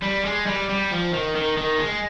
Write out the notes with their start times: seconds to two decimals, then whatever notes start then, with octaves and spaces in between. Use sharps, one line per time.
0.03 G3
0.25 G#3
0.47 G3
0.69 G3
0.91 F3
1.13 D#3
1.36 D#3
1.57 D#3
1.79 G#3